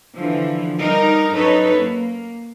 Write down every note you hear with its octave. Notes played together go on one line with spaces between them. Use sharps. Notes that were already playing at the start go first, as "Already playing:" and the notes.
D3 E3 F3
G3 D#4 A#4
F#2 D#4 A4 B4 C#5
A#3